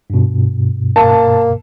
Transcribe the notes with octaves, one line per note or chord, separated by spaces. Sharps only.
G2 B2
A#3 A5